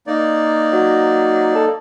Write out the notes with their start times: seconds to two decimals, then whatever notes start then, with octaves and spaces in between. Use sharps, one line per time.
0.07 A#3 D#4 D5
0.73 F#3
1.55 A4